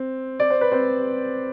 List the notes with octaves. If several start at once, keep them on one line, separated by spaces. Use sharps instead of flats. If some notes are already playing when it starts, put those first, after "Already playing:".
Already playing: C4
D5
C5
B4
C4 C5